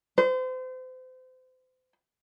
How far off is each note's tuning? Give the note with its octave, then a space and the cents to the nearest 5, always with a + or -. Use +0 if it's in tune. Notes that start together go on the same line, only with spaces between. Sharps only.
C5 -35